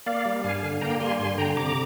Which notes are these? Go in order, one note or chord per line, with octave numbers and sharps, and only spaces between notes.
A#3 D5 F5
G3
G2 F5 G#5
D3
A#3 G5 A#5
G3 G#5 C6
G2 G#5 C6
D3 G5 A#5
C3 A#5 D6